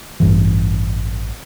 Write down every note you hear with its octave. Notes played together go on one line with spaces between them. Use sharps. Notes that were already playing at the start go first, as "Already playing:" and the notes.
A1 G2 E3